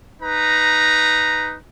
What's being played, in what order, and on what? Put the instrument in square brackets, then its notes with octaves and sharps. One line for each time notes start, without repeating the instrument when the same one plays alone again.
[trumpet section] D#4 B4 A#5